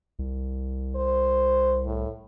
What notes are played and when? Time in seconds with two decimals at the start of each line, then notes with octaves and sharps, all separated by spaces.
0.19 C2
0.96 C5
1.85 A2